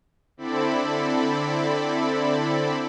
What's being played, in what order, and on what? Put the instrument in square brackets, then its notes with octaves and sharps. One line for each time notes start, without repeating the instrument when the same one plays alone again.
[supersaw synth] D3 C4 E4 A4 D5 B5